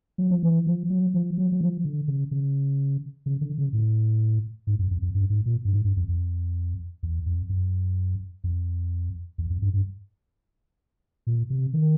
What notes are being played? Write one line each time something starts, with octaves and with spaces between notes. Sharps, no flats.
F#3
F3
E3
F3
F#3
F3
F#3
F#3
F3
D3
C#3
C#3
C#3
D3
C#3
A2
G#2
F#2
F2
F2
G2
G#2
A#2
G2
G#2
G2
F2
F2
E2
F2
F#2
F2
E2
F2
G2
G2
A#2
C3
D#3